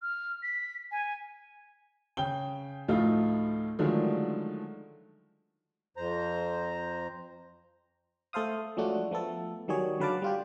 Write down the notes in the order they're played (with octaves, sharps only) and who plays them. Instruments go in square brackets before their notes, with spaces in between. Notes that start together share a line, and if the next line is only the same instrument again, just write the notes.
[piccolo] F6
B6
G#5
[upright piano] C#3 G5 G7
D2 A2 F3 A3 D#4 F4
D3 D#3 F3 F#3 G#3 A3
[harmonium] F2 C5 A#5
[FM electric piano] A3 A4 C5 F5 D#6
F3 F#3 G#3 A3 D4 F#4
F3 A3 B3 A4
D#3 F#3 G3 G#4 C#5
D3 F#3 B4 F5 A5 D6
G3 F4 G4